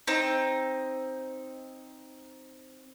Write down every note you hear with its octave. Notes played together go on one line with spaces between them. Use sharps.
C4 D#4